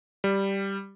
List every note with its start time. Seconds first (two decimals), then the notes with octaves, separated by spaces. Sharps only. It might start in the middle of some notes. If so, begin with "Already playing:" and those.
0.24 G3